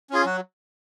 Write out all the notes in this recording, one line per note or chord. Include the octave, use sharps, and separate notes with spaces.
C#4 F4 G#4
F#3 F#4